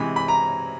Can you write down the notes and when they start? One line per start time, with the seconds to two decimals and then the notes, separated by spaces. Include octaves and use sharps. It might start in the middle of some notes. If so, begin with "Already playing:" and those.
Already playing: C3 E3 G#3 B5
0.16 B5
0.28 A#5